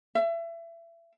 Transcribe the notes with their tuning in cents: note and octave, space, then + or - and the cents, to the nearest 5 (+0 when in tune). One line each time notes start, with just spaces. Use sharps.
E5 +30